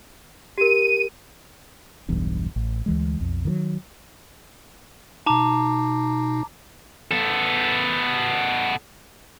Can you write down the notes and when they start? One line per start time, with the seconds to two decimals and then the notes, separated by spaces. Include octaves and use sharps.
0.58 G4 A#4 D#7
2.09 E1 B1 E2 G2
2.56 A1
2.86 D2 E3 G#3
3.20 B1 F2
3.45 D#3 E3 F#3
5.26 B2 D#4 A5 A#5 D6
7.11 B3 A4